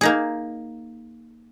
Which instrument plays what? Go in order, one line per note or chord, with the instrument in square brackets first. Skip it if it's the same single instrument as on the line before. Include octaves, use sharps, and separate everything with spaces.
[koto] A#3 D#4 G#4